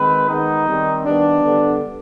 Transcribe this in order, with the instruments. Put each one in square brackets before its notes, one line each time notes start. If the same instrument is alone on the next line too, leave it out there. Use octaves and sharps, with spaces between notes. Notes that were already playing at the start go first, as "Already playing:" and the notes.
Already playing: [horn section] D#3 G#3 C4 B4
D#3 G#3 B3 D#4
D#3 G3 C4
D#3 G3 B3 D4
D3 G3 B3